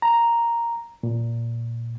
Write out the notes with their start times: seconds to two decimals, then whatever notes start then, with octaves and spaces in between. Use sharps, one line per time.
0.02 A#5
1.03 A#2